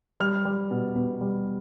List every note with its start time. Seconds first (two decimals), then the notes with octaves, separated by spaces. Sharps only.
0.20 G3 F6
0.45 G3
0.71 B2
0.96 B2
1.21 G3